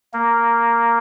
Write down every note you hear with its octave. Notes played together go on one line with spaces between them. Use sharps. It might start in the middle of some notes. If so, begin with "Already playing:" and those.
A#3